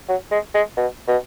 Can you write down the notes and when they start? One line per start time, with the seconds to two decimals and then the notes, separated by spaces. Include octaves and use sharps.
0.08 F#3
0.31 G#3
0.54 G#3
0.77 B2
1.08 B2